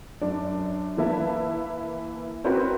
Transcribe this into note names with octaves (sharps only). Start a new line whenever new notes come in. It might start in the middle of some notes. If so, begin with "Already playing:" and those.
F#2 D4
E3 A#3 E4 B4 E5 A5
C4 C#4 E4 F#4 A#4 B4